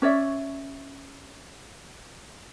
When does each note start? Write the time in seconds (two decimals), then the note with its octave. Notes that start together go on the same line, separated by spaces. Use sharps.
0.02 C#4 C#5 D5 E5